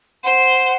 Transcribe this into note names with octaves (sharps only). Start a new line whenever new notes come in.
C5 F#5